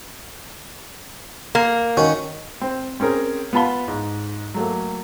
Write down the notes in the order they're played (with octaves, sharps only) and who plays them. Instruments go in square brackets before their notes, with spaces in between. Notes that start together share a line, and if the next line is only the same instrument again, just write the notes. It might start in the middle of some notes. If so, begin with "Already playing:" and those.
[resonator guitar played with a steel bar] A#3
[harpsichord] D#3 C#4 F#4
[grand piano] C4
C4 C#4 G#4 A#4
B3 F4 A5 B5 G7
G#2
F#3 A3 A#3